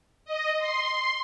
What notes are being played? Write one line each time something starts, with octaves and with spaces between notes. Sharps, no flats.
D#5
C6